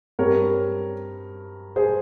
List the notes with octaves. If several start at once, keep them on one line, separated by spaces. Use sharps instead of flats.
G2 G3 C4 A#4 C#5
G#4 C5